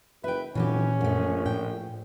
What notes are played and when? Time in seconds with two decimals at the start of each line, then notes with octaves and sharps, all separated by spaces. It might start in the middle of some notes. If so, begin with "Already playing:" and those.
0.24 F#1 B4 E5 G5
0.55 F1 A#2 E3 F#3 C#4 G4
1.01 A#1 F#2 A3
1.46 A2 G5